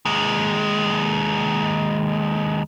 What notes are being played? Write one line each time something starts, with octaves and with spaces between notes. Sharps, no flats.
D#2 G#3